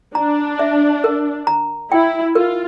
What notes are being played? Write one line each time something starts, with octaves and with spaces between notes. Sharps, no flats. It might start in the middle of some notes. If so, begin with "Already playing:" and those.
D4 A#5
E5
A#4
A#5
E4 G5
F4 A#4